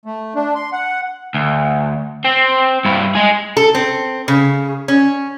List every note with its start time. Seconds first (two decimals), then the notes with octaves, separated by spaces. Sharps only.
0.06 A3
0.35 D4
0.55 C6
0.72 F#5
1.34 D2
2.25 C4
2.85 G2 E4
3.15 G#3 G#4
3.57 A4
3.75 C4
4.28 C#3
4.88 C#4